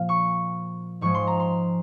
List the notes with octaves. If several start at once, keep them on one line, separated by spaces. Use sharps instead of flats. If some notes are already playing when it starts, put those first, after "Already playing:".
Already playing: A#2 F3 A#3 F4 F5
C#6
G#2 F3 G#3 C#6
C6
A#5
C6